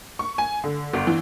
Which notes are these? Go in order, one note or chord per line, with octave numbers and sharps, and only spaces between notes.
C#6
G#5
D3
G1
E3